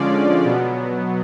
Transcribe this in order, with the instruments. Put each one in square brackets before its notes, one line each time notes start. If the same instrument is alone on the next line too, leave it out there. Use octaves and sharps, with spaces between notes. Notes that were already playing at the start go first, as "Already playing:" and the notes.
Already playing: [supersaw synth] D3 F3 G#3 C#4 F4 D5
B2 F#3 B3